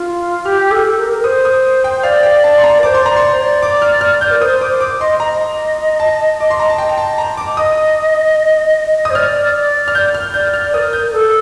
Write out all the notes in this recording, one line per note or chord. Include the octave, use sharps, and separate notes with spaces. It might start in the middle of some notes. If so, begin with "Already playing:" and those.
Already playing: F4
G4 F6
A4
A#4
A#4
C5 D#6
D#6
G5
D5 F5
G5
A5
C6
A#5
A#4
C5 D6
C6
D5 A#5
C6
C5
D5
D6
F6
F6
G6
A#4
C5 D#6
C5 D6
D6
D#5 C6
D#5 A#5
A5
D6
C6
A#5
A5
G5
G5
A5
A#5
D6
D#5 D#6
D#6
C5
D5 F6
D5
F6
G6
F6
D5 G6
F6
A#4 D#6
G6
A#4
A4